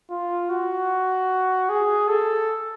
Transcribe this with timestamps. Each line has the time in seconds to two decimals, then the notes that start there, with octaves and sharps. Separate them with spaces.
0.10 F4
0.50 F#4
1.69 G#4
2.08 A4